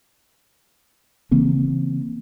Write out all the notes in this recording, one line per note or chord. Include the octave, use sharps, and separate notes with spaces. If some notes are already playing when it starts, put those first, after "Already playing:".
C#3 E3 A#3 C4